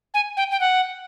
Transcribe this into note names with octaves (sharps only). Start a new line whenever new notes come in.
G#5
G5
G5
F#5